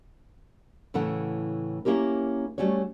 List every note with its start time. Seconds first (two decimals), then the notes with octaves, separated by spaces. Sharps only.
0.94 A2 C#3 E3 A4 F#5
1.85 A#3 C#4 E4 G4 A#4
2.58 G3 A3 C#4 F#4 C#5